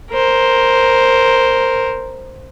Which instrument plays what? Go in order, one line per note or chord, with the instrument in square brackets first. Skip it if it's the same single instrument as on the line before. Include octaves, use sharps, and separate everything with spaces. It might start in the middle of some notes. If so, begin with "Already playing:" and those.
[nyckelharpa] A#4 C5